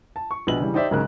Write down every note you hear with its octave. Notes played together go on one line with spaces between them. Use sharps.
A5
C#6
A#1 B2 B4 F#7
C#3 E3 G3
D#4 G4 C5 D5 E5
B1 G#2 C#3 A#4 F#6